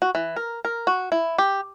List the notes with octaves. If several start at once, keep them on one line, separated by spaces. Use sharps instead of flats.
F#4
E3
A#4
A#4
F#4
E4
G4